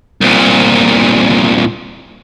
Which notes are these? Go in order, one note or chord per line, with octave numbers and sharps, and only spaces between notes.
C2 A#2